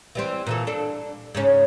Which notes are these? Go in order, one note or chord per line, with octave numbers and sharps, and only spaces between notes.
E3 G3 C4
A#2 E3 A4
D4 A4
G#2 C#3 C#4